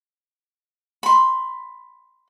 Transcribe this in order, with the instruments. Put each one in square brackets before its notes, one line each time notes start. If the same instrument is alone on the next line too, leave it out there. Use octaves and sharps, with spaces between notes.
[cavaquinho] B5 C6